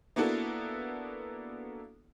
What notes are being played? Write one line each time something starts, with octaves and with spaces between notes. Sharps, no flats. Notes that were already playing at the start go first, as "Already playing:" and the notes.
A#3 B3 D4 E4 F#4 A4